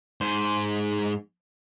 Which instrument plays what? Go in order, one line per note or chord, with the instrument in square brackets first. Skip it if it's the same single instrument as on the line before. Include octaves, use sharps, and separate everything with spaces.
[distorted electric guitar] G#2 C5